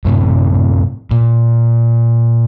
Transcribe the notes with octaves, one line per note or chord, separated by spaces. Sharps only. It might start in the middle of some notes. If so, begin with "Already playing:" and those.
F#2 A2 C3
A#2